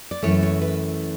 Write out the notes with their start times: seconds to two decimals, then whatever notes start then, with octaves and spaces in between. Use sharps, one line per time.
0.11 D5
0.22 F#2 E3 A3 C#5
0.43 C#5
0.62 B4